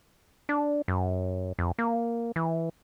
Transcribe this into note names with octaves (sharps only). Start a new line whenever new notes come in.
D4
F#2
F2
A#3
E3